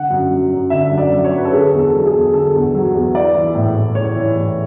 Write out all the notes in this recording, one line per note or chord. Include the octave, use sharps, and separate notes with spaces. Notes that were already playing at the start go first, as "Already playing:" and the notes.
Already playing: D3 F#5
F#2
F#3
F#2
D3 E5
F#2
D5
F#3
C#5
F#2
B4
A4
D3 G#4
E2
A4
F#3
A4
G#4
E2
D3 A4
E2
F#3
E2
E3 D5
E3
A2
A2
E3 C#5
E3
A2